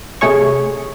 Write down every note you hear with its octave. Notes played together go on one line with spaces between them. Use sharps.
C3 A3 G#4 C#5 C#6